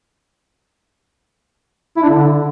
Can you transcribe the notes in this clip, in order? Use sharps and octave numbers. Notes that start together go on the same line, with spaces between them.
E4
D4
D3